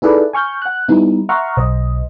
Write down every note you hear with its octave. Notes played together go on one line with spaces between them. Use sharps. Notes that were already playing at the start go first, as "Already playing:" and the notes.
D#4 E4 G#4 A4 B4 D5
G#5 C#6 F6 G6
F#5 F#6
G3 B3 D#4 E4
E5 F#5 A#5 C6 C#6 F6
B1 C5 D#5